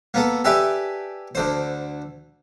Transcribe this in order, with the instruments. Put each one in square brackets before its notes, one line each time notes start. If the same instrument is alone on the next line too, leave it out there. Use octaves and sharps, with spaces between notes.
[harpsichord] A#3 B3 A4
G4 A4 B4 D5 E5 G#5
D2 D3 C5